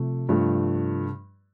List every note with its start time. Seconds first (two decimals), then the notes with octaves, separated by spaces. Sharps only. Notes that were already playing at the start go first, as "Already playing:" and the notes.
Already playing: C3 F3 A3
0.29 G2 F3 A3